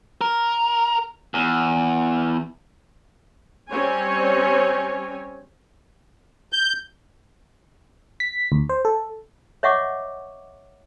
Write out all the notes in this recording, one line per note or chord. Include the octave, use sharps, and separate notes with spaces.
A#4
E2
G3 C4 C#4 C#5 G#5
G6
B6
D2
C5
A4
C#5 D#5 E5 F#5 C#6 D6